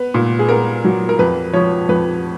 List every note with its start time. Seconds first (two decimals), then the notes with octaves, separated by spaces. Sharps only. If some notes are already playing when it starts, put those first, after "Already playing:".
Already playing: B3 B4
0.14 A#2
0.39 G#4
0.49 B3 A#4
0.85 F#3
1.09 A#4
1.19 F2 B4
1.54 F3 C#5
1.89 F2 B4